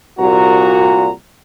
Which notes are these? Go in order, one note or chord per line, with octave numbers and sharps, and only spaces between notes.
C2 A#2 F#4 A#5